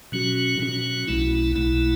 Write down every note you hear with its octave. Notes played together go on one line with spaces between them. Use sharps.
B2 F#3 C#4 F#4
B2 F#3 C#4 F#4
B1 B2 A3 E4
B1 B2 A3 E4